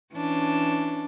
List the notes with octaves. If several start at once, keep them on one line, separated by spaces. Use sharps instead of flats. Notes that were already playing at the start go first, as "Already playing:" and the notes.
E3 C#4 D4